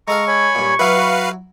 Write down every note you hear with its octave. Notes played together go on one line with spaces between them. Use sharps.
G#3 A4 F5 A#5 C#6
C#5 G#5 B5
G2 A#2
F#3 E4 B4 F5
F#4